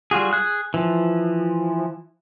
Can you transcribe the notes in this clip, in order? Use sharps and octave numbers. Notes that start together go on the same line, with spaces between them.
G3 F4 F#4 G#4
G#4 F#6
E3 F3